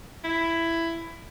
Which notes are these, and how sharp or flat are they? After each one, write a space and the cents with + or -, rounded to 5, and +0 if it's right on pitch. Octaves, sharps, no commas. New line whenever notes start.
E4 +10